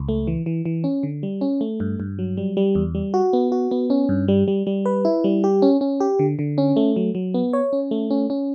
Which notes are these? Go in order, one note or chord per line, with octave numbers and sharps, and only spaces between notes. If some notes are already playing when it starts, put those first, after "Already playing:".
Already playing: C#2
A3
E3
E3
E3
C#4
D3
G3
C#4
A3
G2
G2
F#3
G3
G3
E2
G3
F#4
B3
F#4
B3
C#4
G2
G3
G3
G3
B4
E4
G3
G4
C#4
C#4
G4
D3
D3
C#4
A3
F#3
F#3
B3
C#5
C#4
A3
C#4
C#4